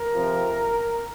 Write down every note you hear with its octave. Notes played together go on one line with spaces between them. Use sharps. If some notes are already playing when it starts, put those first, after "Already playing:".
Already playing: A#4
F2 C3 F3